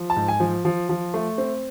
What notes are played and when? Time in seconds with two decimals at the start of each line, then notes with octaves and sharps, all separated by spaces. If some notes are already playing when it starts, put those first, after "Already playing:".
Already playing: F3
0.10 A5
0.16 G#2
0.28 G#5
0.40 F3
0.65 F3
0.89 F3
1.14 A3
1.38 C4